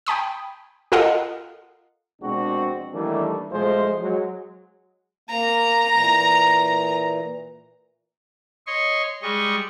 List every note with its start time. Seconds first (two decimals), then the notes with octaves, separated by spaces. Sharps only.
0.06 G5 G#5 B5 D#6
0.92 F4 A4 A#4 D#5 F5 F#5
2.21 A#1 B2 G#3 C4 D4 F#4
2.94 D#3 E3 G3 A3 A#3 D4
3.51 B1 F3 G#3 A3 F4 C5
4.01 F#3 G#3
5.30 A#3 A#5
5.95 A#2 E3
8.67 C#5 D#5 C6 C#6
9.23 G3 G#3 D#5 C#6